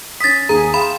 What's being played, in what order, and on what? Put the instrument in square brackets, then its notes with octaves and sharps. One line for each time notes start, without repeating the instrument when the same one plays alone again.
[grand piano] C#4 D#6 [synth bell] A6 B6
[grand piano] D#2 [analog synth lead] G#4 [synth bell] A#5
[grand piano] F5 G5 C6 [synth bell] B5